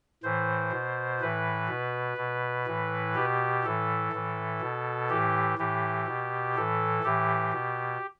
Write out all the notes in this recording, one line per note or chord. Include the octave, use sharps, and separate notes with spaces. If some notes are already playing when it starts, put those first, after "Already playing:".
A2 E3 C5
B2
A2 E3 B4
B2
B2
A2 E3
B2 G4
A2 E3 A4
A2 E3
B2
A2 E3 G4
A2 E3 G4
B2
A2 E3 A4
A2 E3 G4
B2